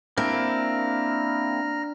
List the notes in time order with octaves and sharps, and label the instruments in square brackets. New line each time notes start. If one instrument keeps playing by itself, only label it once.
[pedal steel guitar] A#3 C4 E4 [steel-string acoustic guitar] D4 [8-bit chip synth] A#5 F6 A#6